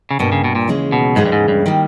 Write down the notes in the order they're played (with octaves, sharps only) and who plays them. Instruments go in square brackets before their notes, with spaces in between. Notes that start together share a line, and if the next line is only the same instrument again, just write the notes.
[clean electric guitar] C#3
[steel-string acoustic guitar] G2 G3 A#3 [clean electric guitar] B2
[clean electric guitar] C#3
B2
A#2
[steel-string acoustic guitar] D#2 C#3 E3 G#3 C#4
[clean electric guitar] B2
[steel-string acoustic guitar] D#2 C#3 E3 G#3 C#4 [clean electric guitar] G#2
[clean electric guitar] G2
G#2
G2
[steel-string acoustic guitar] D#3 G3 A#3